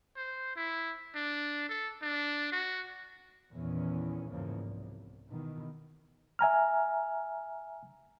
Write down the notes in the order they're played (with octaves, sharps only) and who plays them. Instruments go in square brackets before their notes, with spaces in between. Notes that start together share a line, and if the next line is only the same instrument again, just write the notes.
[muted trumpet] C5
E4
D4
A4
D4
F#4
[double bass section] E2 A#2 D#3 E3 C#4
E2 G#2 C#3 F3 A#3
C2
B2 D#3 E3
[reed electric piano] E5 G#5 A#5 F6